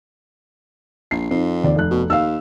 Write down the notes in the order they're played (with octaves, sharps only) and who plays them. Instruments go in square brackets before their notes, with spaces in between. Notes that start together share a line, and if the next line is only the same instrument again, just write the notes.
[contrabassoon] A#1 [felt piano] C7
[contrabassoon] F2 [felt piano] C4 D#4
[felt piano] D#2 D5
F1 F#6
[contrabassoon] B2
[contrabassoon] D#2 [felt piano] F5 E6